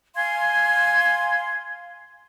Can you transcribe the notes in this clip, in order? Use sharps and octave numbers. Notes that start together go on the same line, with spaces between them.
F5 G#5 C6 G#6